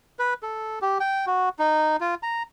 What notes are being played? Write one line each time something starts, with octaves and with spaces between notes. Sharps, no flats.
B4
A4
G4
G5
F#4
D#4
F4
A#5